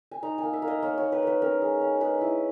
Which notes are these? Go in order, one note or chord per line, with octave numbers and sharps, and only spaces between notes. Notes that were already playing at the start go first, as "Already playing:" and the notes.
G#5
D#4 A#5
A#3 G#5
E5
A#3
D#5
A#3 C#5
A#3 C#5
B4
A#3 B4
C#4 A#4
G#3
C#4
G#3 B4
E4